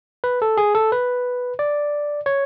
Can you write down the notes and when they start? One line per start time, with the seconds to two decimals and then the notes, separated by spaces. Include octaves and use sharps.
0.24 B4
0.42 A4
0.57 G#4
0.75 A4
0.92 B4
1.59 D5
2.26 C#5